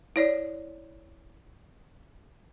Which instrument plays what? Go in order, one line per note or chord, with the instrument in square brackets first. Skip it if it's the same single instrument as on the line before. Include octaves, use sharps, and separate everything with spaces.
[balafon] E4 C#5 D5